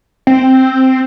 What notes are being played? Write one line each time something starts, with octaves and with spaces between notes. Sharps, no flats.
C4